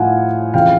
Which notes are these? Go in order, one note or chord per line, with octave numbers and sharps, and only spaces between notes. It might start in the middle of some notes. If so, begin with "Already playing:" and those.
Already playing: A2 F3 F5 F#5 G#5
F2 C#3 E3 F5 G5